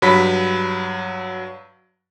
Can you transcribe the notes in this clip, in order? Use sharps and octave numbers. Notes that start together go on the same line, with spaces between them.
G2 F#3 B5 B6